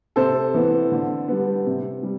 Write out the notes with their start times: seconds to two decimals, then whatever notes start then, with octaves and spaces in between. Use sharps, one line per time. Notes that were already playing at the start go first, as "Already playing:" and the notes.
0.16 C3 A4 C5
0.54 E3 B3
0.92 D3
1.28 G3 B3
1.67 C3
2.03 G3